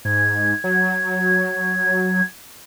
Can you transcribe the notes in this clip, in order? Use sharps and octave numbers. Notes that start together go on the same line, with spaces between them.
G#2 G#6
F#3